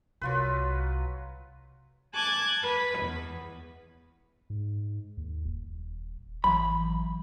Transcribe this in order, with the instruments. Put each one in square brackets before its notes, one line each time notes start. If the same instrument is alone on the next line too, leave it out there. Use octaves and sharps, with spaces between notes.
[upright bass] C2 [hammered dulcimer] F#3 F4 B4
[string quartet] G#5 A5 D6 F#6 G#6
B4
E2
[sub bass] G#2
D#2
D#1
[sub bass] G#1 [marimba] E3 F#3 [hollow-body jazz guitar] B5